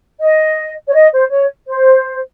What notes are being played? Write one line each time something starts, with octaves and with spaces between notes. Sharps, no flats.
D#5
C#5
D#5
C5
C#5
C5